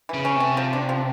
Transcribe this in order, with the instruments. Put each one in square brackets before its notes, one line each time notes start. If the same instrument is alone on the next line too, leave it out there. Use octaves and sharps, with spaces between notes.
[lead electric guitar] C#3 [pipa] E3
[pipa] C#4
[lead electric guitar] C3 [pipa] A3
[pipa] F3
D4
F3